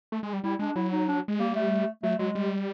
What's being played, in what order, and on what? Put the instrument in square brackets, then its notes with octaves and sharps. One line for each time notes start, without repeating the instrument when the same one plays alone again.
[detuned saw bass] A3
G#3
G3
[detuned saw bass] G3 [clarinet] E4
[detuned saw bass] G#3 [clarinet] D4
[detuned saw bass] F#3 [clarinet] E4
[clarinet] D#4
D4
[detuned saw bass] G#3
[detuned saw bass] G3 [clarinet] A#3
[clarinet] A3
[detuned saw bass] F#3 [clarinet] A3
[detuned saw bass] F#3 [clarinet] G#3
[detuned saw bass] G3